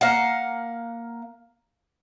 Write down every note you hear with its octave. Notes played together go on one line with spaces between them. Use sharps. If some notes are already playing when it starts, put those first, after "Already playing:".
A#3 F5 F#5